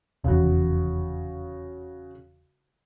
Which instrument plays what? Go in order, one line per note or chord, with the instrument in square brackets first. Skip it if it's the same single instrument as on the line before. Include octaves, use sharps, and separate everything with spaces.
[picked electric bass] F1 E2 [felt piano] C#3 F#4